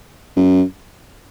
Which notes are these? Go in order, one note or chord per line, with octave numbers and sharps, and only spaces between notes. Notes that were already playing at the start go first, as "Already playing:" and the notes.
F#2